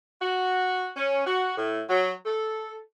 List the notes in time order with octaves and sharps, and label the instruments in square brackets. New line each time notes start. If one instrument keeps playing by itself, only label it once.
[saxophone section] F#4
C#4
F#4
A2
F#3
A4